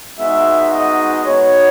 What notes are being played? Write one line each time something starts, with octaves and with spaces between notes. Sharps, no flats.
G#3 B3 D#4 F#4 E5
D#5
B3 D#4 F#4 C#5